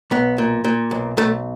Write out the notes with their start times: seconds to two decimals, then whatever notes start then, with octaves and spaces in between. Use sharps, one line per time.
0.11 B1 B3
0.38 A#2
0.64 A#2
0.91 B1
1.17 B1 A3